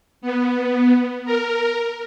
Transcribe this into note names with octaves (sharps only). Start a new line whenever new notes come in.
B3
A#4